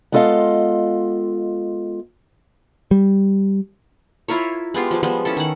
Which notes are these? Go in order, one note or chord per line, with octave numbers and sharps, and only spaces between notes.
G#3 B3 F4 A4 D#5 F5
G3
E4 F4 A#4 C#5
G#3 B3 F4 G4
F3 G#3
F3 G3 G#3 B3
C#4 E4 A4
D#3 F#5